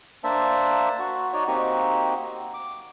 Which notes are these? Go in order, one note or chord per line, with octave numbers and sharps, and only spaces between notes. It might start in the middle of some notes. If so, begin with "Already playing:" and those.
A#3 D4 C5 E5 A5
F#4
D#4 F#4 C#5 D5
A#3 C4 D#4 F#4 G4
D6